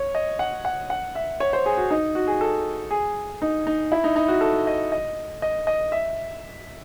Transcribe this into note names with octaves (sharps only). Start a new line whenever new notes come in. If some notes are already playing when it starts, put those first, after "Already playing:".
Already playing: C#5
D#5
F#5
F#5
F#5
E5
C#5
C5
G#4
F#4
D#4
F#4
G#4
A4
G#4
D#4
D#4
E4
D#4
D#4
F#4
A4
D#5
D#5
D#5
D#5
E5